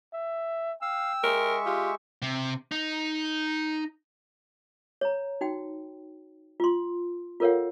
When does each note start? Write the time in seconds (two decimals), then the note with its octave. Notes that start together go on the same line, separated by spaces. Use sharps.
0.13 E5
0.82 F5 G5 E6
1.23 G#3 A#4 E5 C#6
1.66 F4 G4
2.22 C3
2.71 D#4
5.01 C#5 A#5
5.41 D#4 F#4 G5
6.60 F4 C6
7.40 F4 A4 A#4 C#5 F5 F#5